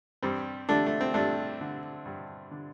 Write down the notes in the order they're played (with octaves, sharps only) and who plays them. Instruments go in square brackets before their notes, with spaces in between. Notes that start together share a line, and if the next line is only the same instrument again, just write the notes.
[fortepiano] G2 G3 C4
D3 A3 D4
A3
C4
G2 A3 D4
D3
G2
D3